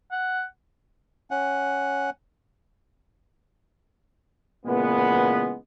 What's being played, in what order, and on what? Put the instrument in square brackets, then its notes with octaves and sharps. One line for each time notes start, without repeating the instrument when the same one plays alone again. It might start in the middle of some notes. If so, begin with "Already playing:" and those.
[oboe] F#5
[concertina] C#4 F#5
[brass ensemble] A#2 C#3 E3 G#3 B3